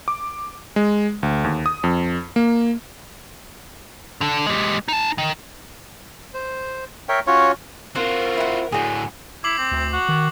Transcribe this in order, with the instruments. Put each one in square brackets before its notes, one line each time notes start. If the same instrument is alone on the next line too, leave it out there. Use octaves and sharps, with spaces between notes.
[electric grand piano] D6
G#3
D2
D#2
D#6
F2
A#3
[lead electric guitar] D3 A4
G#3 G4
D#4 A5
D#3
[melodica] C5
A#4 C#5 E5 G5
C#4 F4 F#4 C#5
[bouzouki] C4 [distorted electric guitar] F4 F#4 [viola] A#4 [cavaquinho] F#5
[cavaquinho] E4 F#5
[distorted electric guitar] A2 D3 [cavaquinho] F#4 G#4
[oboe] E4 [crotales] D6 C7 F#7
[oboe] C4
[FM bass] D2
[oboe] F#4
[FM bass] D#3